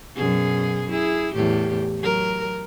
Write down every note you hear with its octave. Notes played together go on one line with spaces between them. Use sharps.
F#2 B2 G#4
E4 G#4
E2 A2 G4
F#3 A#4